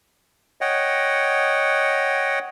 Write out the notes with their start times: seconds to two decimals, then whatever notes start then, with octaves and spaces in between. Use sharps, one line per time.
0.61 C#5 D#5 F#5 G5